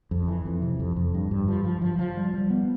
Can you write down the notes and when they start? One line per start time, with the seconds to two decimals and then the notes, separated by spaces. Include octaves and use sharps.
0.11 F2
0.28 E3
0.45 F2
0.62 C3
0.80 F2
0.96 F2
1.14 G2
1.31 G2
1.48 F3
1.65 F3
1.82 F3
1.99 F3
2.17 G3
2.34 G3
2.50 B3